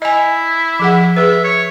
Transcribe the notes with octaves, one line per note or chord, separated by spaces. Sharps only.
E4 D#5 G#5
F3 G#4 F#5
G#4 B4 E5
C#5